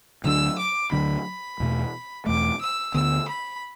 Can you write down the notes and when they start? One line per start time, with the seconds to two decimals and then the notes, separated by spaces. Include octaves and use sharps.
0.24 D2 D3 F#3 D4 E6
0.59 D6
0.92 D2 D3 F#3 D4 B5
1.60 E2 B2 A3
2.26 E2 B2 A3 D6
2.61 E6
2.94 D2 D3 B3 E6
3.28 B5